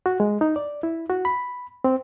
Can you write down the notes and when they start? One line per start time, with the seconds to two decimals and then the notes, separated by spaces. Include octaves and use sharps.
0.06 F#4
0.20 G#3
0.41 D#4
0.56 D5
0.83 E4
1.10 F#4
1.25 B5
1.84 C4